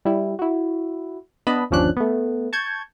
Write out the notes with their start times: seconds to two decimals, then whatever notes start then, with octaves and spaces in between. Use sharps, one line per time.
0.05 G3 E4
0.39 E4 F#4
1.47 B3 D4 B4 D#5 A5 B5
1.70 G1 D#2 F3 C#4 D4 F#6
1.97 A3 B3
2.53 A5 C#6 G6 G#6